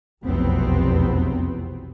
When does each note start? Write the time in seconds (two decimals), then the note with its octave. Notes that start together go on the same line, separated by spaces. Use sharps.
0.25 F1 B1 E2 F#3 B3 C4